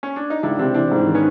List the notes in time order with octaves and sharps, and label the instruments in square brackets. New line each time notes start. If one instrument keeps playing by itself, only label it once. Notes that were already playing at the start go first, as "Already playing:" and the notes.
[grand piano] C#4
D4
D#4
[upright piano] C#2 [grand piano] D4 E4
[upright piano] C3 [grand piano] C4 D4
[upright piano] E3 [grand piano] C4 D4
[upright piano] G#2
D#3
[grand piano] B3 C#4